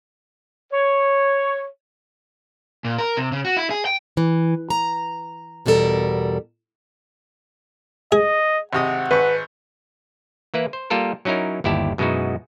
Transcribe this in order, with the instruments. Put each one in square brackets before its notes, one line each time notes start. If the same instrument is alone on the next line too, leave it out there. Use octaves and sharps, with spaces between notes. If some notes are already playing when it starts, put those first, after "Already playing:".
[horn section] C#5
[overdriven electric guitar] A#2
A#4
C3
C#3
F#4
E4
G#4
G5
[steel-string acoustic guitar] E3
A#5
E2 B2 G3 D4 A4 A#4
[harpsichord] G#4 [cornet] D#5
[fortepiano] G#1 C3 D#5 [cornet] F#5
[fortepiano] G#1 C#6 [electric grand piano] B4
[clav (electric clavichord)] E3 A#3 E4 B4
C5
G3 A#3 F4 A4 A#4
F#3 C#4 D#4 E4 A#4
G1 D#2 E4 G4 D5 A5
F#2 B2 G#3 D#4 E4 F#4